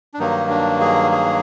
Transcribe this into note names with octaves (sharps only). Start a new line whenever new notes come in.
D4
G2 D#3 F#3 A#3 D#4
D4
G#4
G#4